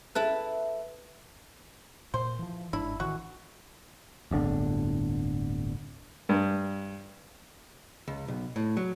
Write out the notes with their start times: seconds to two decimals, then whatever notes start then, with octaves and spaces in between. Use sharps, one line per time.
0.15 E4 A4 B4
2.14 A#2 C5
2.39 E3 F3
2.73 G1 G#2 D4 E4
3.00 A1 D#3 E3 F#4
4.31 D1 G1 D3
6.29 G2
8.08 C#2
8.28 B1
8.56 A2
8.77 F#3